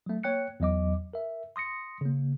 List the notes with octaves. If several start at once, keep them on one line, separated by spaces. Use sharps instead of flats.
F#3 A3
A#3 C#5 G5 F#6 C#7
E2 F#3 D#5 D6
A#4 E5
C6 D#6 A#6 C#7
C#3 A#3